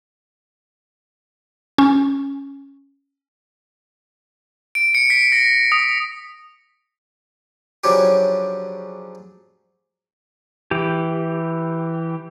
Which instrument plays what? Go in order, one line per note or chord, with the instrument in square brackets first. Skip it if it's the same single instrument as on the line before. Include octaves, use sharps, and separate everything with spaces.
[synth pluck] C#4
[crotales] D7
C#7
B6
A#6
D#6
[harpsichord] C#3 F3 F#3 C#4 D4 G4
[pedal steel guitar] E3 G4